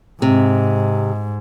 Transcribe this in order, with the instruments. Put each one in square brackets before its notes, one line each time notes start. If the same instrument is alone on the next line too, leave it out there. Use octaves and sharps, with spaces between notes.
[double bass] G#2 [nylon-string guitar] C3